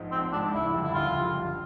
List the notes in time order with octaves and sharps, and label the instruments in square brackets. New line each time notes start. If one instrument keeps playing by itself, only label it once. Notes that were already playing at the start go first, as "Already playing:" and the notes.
Already playing: [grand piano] A#1 G#2 F3 G#3
[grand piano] A#1 [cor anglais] C4
[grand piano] G#2 F3 G#3 [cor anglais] D4
[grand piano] F#1 [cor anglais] E4
[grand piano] F2 D3 G3
[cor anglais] E4
[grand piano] F#1 [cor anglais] F4
[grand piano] F2 D3 G3
A#1